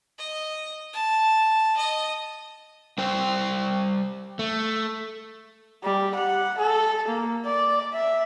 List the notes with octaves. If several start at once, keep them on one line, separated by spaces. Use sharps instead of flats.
D#5
A5
D#5
G3 C5 G5
A3
G3
F#5
A4
A#3
D5
E5